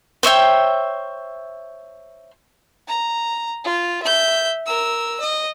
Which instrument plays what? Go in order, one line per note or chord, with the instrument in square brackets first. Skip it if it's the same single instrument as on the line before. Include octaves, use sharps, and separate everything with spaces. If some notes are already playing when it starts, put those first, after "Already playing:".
[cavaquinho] C5 C#5 E5 G5
[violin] A#5
F4
E5 G6
A#4 E6
D#5